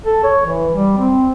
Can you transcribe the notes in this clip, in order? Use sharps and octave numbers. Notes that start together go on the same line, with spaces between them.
A4
C#5
E3
G3
C4